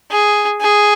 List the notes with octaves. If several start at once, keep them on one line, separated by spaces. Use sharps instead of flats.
G#4
G#4